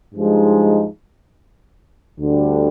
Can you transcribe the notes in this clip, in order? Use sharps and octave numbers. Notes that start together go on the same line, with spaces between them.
G2 F3 G#3 D#4
D2 D3 G3 D4